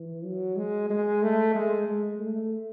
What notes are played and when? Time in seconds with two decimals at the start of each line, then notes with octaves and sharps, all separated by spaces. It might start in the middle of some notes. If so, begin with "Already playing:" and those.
Already playing: E3
0.24 F#3
0.56 G#3
0.90 G#3
1.22 A3
1.55 G#3
1.88 G#3
2.19 A3